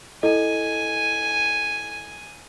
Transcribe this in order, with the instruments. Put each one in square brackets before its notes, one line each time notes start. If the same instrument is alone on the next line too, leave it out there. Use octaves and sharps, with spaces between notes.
[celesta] E4 A4 D#5 [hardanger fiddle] G#5